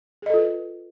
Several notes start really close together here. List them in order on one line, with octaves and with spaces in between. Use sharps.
G#4 D#5 A4 F4 B4